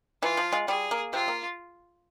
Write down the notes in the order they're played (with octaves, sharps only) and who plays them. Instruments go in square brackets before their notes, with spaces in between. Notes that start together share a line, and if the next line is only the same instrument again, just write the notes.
[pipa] E3 [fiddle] F4
[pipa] F3
G#3
[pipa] G3 [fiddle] G#4
[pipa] A#3
[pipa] C3 C4 [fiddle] F4
[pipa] A#3